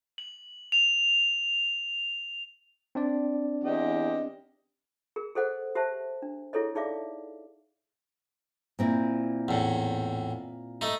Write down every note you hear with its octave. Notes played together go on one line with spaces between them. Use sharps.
F#7
F7
C4 D4 D5
E2 G4 D#5
G#4 A#4
G#4 A4 C5 D#5 F#5
G4 C5 E5 A5
D4
E4 G#4 A4 C#5 D#5
D#4 G#4 D5 E5 F5 D6
A#2 C4 E4
E2 A2
A3 D#4